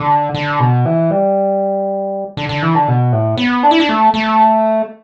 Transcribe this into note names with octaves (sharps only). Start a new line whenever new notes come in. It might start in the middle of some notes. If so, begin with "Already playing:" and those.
Already playing: D3
D3
B2
E3
G3
D3
D3
E3
D3
B2
A2
B3
D4
E4
D4
A3
A3